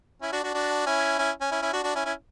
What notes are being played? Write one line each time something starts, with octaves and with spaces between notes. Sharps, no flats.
C#4 E4
D4 F#4
D4 F#4
D4 F#4
C#4 E4
C#4 E4
C#4
C#4 E4
C#4 E4
D4 F#4
D4 F#4
C#4 E4
C#4 E4